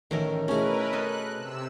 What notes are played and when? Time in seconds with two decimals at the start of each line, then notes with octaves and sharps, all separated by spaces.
0.11 A1 A2 D#3 C#4 A#4
0.48 B2 A3 C#4 E4 G#4 A#4 B4
0.93 A4 D#5 G#5 F#6
1.36 C3 E6